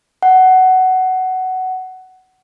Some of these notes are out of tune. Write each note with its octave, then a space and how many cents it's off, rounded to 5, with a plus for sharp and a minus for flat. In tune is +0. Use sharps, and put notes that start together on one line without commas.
F#5 +15